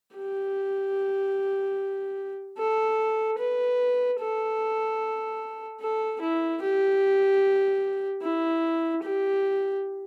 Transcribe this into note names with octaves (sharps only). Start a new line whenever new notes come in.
G4
A4
B4
A4
A4
E4
G4
E4
G4